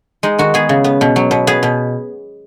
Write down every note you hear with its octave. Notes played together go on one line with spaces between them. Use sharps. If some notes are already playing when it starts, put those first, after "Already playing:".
G#3 D#4
D#3 F#4
B3 G#4
C#3
B3
B2
F#3
B2
B3 G#4
B2